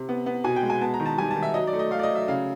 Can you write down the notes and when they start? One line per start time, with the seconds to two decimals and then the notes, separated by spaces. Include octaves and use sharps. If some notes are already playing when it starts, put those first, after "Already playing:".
Already playing: C3
0.09 B3
0.26 B3
0.44 B2 G#5
0.56 G5
0.63 G#3
0.70 G#5
0.81 B3 A5
0.94 A#5
1.00 D#3
1.06 A5
1.18 G3 G#5
1.31 A5
1.36 D#3
1.43 E5
1.54 F#3 D#5
1.67 D5
1.73 A3
1.79 D#5
1.91 A3 F5
1.99 D5
2.03 D#5
2.09 F#3
2.15 E5
2.28 C#3 F5